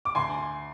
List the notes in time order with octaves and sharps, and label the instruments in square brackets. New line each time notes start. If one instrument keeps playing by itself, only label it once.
[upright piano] D6
D2 G#5 C6